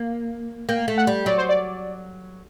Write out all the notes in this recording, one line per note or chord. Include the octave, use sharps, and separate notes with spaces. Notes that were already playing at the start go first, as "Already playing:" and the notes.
Already playing: A#3
A#3 G5
A3
F#5
G3
F#3 D5
C5
D5